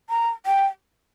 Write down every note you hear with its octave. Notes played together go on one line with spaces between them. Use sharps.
A#5
G5